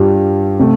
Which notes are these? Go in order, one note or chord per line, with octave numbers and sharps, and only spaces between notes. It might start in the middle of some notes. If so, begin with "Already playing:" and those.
Already playing: G2 G3 F4
C3 A3